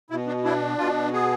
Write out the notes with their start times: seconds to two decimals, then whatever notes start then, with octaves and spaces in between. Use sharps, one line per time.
0.10 B2 E4
0.27 D4
0.44 D4 E4
0.78 B2 F4
1.12 B3 G#4